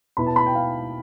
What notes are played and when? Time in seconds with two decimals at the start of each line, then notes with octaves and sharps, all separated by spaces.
0.17 B2 B3 E4 B5
0.26 A5
0.36 B5
0.46 G5
0.55 F5